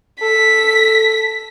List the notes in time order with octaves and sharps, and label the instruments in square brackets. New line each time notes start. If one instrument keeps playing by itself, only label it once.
[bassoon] A4 [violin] B6